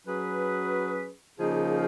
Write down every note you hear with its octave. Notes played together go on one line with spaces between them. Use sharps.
F#3 C#4 G#4 B4
C#3 F3 A#3 D#4 G#4